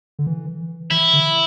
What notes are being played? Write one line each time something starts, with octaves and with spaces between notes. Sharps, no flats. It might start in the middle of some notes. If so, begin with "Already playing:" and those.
D3
E3
E3 E4
D3